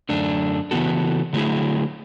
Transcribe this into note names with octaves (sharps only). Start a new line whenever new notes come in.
F#2 D3 A3 D4
C#3 E3 B3 F#4 A4
D3 F#3 A3 E4 G#4